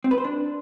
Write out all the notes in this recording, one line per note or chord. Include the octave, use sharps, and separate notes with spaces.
C4
B4
C5
D4